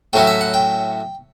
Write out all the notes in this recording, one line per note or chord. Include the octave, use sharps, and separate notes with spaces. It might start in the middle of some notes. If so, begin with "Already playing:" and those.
A2 F#3 C#4 E4 G5
E5
F#5
G5